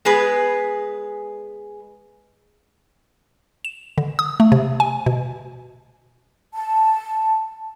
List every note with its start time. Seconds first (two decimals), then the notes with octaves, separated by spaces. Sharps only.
0.05 G#3 B3 G#4 B4
3.65 E7
3.98 D3
4.19 D#6
4.40 A3
4.52 C3
4.80 G#5
5.06 B2
6.53 A5